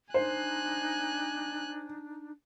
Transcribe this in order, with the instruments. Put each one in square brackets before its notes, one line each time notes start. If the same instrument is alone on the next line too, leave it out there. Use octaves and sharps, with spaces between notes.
[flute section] D4 D#4 [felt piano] C5 [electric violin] G#5 F#6